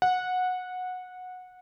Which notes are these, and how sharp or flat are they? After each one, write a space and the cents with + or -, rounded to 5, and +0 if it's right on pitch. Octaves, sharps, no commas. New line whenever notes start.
F#5 -15